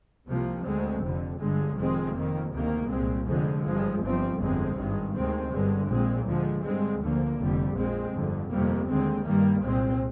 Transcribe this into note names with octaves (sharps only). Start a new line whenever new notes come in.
C2 C3 F3 A#3
D2 D3 G#3 C4
F1 F2 D3
G1 G2 D3 G#3
F1 F2 D#3 G#3 C4
F2 D#3 A#3
D2 C3 D#3 A#3
C2 A#2 G#3 C4
F1 F2 D3 F3 G#3
G#1 G2 F3 G#3
G1 G2 F3 C4
G1 F2 D3 G#3 C4
G#1 G2 D#3 G#3
D2 C3 D#3 G#3 C4
G1 G2 D3 G#3
A#1 A#2 G#3 C4
D2 D3 F3 G#3
G2 D3 G#3 C4
D2 D3 F3 A#3
F1 F2 D3 G3
A#1 A#2 G#3 C4
G1 F2 D3
G1 F2 C3 G3 A#3
D#2 D3 G#3 C4
G2 D#3 G3 A#3
C2 A#2 G#3 C4